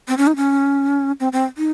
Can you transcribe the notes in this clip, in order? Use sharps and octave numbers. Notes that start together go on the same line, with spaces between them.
C4
C#4
D#4
C#4
C4
C4
D#4